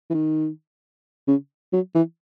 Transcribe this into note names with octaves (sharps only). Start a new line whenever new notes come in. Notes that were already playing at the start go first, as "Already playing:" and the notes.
E3
D#3
C#3
F#3
E3